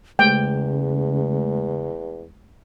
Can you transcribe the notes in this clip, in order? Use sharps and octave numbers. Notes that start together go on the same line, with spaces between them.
E2 C#3 G#3 A3 G5